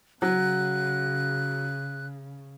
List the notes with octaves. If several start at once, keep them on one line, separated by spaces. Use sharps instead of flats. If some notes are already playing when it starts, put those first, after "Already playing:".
C#3 F#3 F#6